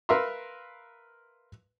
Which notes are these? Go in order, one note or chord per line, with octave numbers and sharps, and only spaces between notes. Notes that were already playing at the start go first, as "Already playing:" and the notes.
A#4 B4 E5 F5 A#5 C6